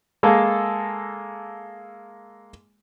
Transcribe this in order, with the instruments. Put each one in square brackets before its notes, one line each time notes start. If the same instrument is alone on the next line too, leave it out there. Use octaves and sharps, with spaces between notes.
[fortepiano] G#3 A#3 A4